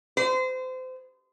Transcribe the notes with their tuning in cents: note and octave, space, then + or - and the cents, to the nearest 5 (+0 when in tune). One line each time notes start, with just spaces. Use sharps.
C5 -30